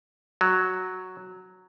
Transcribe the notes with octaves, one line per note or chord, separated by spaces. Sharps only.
F#3